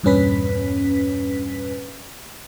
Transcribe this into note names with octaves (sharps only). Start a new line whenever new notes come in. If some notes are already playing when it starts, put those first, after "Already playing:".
E2 G2 A#2 C#4 B4 B6